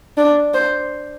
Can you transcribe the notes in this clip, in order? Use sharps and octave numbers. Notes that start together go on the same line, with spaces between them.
D4
C5